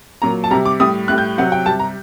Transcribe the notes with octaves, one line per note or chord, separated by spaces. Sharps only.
A#2 F#3 A#5
A5
C3 G3 A#5
D6
A2 G3 D#6
A2 G3 F#6
G6
C3 F#3 F#5
G5
C3 G3 A5
A#5